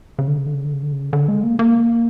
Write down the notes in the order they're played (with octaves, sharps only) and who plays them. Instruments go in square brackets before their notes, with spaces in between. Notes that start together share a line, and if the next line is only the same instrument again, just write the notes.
[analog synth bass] C#3
D3
C#3
D3
C#3
D3
C#3
D3
C#3
D3
G#3
A#3
A#3